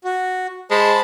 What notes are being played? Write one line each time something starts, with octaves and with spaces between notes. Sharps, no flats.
F#4
G#3 C5 A5 B5